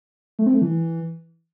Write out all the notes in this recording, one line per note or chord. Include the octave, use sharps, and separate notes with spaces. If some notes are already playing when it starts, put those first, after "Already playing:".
A3
C4
A3
E3